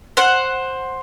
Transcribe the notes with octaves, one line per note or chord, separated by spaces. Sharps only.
C5 F#5